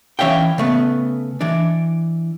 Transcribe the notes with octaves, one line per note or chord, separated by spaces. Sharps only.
E3 C#4 C#5 E5 F5 G5
C#3 A3 B3
E3 D4